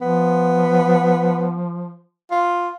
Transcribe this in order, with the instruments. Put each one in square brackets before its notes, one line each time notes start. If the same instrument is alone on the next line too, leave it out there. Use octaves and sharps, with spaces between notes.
[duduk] F3 [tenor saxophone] B3
[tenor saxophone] F4